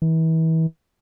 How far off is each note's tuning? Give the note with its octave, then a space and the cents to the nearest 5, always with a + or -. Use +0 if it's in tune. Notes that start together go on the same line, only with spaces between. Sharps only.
E3 -35